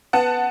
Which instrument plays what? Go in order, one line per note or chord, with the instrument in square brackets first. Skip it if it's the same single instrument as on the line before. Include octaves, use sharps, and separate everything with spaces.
[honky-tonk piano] B3 F#5 A5